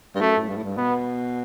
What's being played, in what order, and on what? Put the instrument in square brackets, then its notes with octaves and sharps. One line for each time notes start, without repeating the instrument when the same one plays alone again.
[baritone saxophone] G2
[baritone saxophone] F#2 [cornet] A3
[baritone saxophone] A2
G2
A2
G2
[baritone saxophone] B2 [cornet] B3